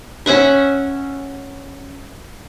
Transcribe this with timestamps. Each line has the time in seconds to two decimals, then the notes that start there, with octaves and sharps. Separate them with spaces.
0.26 C#4 E5 F#5 C#6